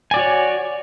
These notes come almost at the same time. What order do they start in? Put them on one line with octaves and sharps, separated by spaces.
G#5 D5 F#4 C#5